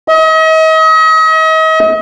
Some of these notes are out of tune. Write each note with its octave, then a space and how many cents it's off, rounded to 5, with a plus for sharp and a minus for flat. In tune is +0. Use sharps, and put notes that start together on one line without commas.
D#5 +40